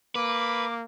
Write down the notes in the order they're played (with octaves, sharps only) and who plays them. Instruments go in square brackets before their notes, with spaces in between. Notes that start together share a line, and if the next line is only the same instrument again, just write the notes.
[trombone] A#3 [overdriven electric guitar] B4 [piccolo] D6